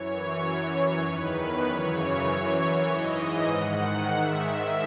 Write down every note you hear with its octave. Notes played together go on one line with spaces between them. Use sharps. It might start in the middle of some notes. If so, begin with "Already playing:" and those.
Already playing: F#2 E3 C#5
F#2 E3
E2 D#3 B4
F#2 C#3 E3 C#5
F#2 E3
G#2 E3 D#5
G#2 D#3 F#5
G#2 D#3 E5